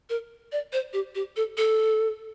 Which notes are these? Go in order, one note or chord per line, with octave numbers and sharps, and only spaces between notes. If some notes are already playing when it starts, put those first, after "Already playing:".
A#4
D5
C5
G4
G4
A4
A4